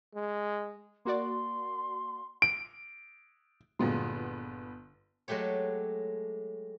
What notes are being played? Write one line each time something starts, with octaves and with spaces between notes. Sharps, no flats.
G#3
A#3 F#4 D5 C6
D7
G1 A#2 F#3 G#3 B3 C6
F#3 G#3 A3 G4 C#5